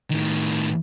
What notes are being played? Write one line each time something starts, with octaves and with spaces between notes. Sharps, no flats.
A2 D#3